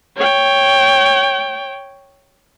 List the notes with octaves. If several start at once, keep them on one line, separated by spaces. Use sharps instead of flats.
C#5 G5